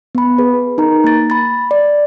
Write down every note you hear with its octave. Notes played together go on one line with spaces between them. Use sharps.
B3 B5
G#4 B4
D#4 A#4 A#5
A#3 A6
B5 A6
D5